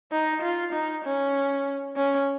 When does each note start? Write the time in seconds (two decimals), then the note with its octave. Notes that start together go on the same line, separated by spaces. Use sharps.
0.12 D#4
0.42 F4
0.73 D#4
1.04 C#4
1.97 C#4